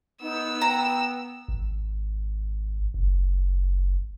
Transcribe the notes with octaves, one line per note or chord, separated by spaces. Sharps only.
B3 D#4 E6
G5 A#5
G#1
F#1